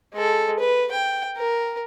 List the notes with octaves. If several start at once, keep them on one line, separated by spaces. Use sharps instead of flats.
G#3 A4
B4
G5
A#4